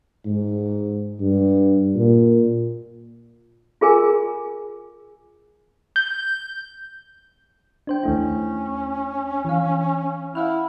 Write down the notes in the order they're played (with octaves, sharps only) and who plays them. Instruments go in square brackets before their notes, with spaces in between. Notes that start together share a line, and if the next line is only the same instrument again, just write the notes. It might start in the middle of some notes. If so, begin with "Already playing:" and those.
[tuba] G#2
G2
A#2
[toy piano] F4 G#4 A#4 G#5
[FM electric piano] G6
[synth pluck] D4 C5 G5
[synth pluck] D#2 A3 E4 [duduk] C#4
[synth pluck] E3 F5
[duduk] E4 [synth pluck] F5 F#5 F6